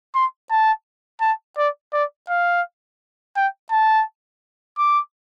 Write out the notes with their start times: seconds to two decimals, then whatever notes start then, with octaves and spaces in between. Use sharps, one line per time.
0.15 C6
0.50 A5
1.21 A5
1.57 D5
1.93 D5
2.29 F5
3.36 G5
3.71 A5
4.78 D6